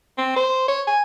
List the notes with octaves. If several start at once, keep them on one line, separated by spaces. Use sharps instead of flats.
C4
C5
C#5
G#5